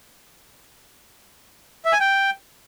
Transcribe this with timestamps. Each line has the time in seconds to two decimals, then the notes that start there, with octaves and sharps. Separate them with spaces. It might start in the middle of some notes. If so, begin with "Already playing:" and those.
1.85 E5
1.93 G#5
2.00 G5